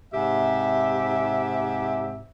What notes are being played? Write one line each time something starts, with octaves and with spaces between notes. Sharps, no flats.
G#2 C3 G4 E5